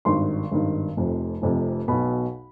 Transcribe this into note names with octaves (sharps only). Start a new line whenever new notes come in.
G#1 G2 D#3 C6
G#1 G2 D#3
F1 F2 C3
F1 F2 C3
B1 B2 B5